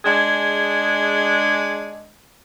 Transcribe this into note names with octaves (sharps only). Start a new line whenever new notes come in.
G#3 D4 G#4